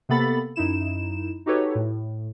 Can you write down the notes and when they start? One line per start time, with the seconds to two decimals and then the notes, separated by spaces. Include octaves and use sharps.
0.09 C3 A#3 B3 A4 B5 A6
0.56 F#2 D#4 E4 E7
1.46 D#4 F#4 G4 A4 B4 C#5
1.75 A2